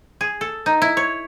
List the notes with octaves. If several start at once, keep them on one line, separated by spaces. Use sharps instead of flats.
G#4
A4
D#4
E4
C#5